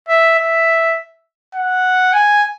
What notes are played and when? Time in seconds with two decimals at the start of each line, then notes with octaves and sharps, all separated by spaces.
0.09 E5
0.39 E5
1.54 F#5
2.13 G#5